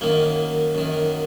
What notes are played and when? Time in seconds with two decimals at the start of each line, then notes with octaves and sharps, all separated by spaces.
0.01 F#2 D#3 A#3
0.75 F#2 D#3